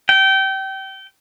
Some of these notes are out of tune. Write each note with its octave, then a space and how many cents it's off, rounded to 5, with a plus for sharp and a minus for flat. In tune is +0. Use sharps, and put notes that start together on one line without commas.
G5 -25